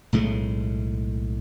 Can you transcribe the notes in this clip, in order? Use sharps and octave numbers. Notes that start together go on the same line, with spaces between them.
B1 A2 G#3 A3